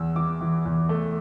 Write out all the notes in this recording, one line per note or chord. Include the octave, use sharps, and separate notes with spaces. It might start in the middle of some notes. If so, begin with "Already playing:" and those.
Already playing: E2 E6
E3 D6
E3
E2
A3